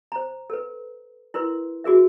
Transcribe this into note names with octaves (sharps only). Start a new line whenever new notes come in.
C5 A#5
A4 B4
E4 A#4 B4 C6
F#4 G#4 A#4 E5